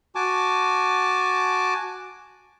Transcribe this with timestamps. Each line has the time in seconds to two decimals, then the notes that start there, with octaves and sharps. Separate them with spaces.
0.15 F#4 G#5 A5 D6